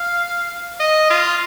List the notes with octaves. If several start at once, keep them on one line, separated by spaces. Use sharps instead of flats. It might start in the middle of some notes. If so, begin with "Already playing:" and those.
Already playing: F5
D#5
F4